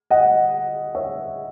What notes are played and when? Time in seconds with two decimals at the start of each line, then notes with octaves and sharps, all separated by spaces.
0.11 D#5 F#5
0.95 C#5 E5